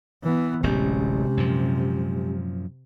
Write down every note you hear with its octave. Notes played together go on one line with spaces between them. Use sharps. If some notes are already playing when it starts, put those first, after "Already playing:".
E3 B3
D1 A1 F#2 C3 G#3 C#4 G4
F#2 A#2 F3